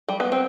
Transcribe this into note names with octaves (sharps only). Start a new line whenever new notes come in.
G3
B3
C4